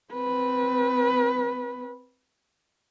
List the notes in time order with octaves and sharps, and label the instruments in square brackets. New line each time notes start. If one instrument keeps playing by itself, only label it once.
[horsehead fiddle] C4 B4